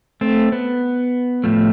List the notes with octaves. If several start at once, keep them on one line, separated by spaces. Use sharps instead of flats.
A3 C4
B3
A2 F3 A3